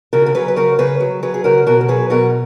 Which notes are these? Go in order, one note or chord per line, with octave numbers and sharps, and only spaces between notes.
C#3 F#4 A#4
A#4
F#3 G#4 B4
B4
C#3 F#4 A#4
C#3 G#4 B4
F#3
F#3 G#4 B4
G#4
C#3 F#4 A#4
B2 F#4 A#4
A#4
F#3 G#4 B4
B2 F#4 A#4